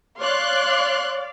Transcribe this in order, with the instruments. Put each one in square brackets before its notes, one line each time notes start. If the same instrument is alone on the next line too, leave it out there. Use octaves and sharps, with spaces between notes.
[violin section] C#5 C6 F#6 [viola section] D5 F5